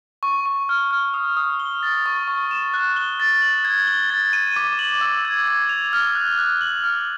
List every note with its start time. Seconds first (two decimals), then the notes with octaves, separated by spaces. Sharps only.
0.23 C#6
0.46 C#6
0.69 F6
0.91 F6
1.14 D#6
1.37 D#6
1.60 G7
1.83 A6
2.06 C#6
2.28 C#6
2.51 E7
2.74 F#6
2.97 G7
3.20 A6
3.42 F#7
3.65 G#6
3.87 G7
4.10 A6
4.33 D#7
4.56 D6
4.79 F#7
5.01 E6
5.25 G#6
5.47 G#6
5.69 F7
5.93 F6
6.15 F#6
6.39 F#6
6.61 F#7
6.84 F6